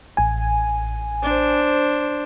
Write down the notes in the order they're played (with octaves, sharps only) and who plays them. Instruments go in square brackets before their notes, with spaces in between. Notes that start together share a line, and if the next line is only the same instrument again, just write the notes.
[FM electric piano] A1 G#5
[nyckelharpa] D4 C5